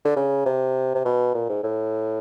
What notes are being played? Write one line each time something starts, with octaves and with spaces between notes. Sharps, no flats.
D3
C#3
C3
C3
B2
A#2
G#2
A2